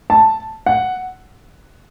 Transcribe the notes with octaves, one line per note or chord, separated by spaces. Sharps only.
A5
F#5